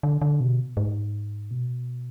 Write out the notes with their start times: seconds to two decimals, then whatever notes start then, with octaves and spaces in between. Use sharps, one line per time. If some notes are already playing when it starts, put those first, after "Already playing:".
0.03 D3
0.22 D3
0.40 B2
0.77 G#2
1.51 B2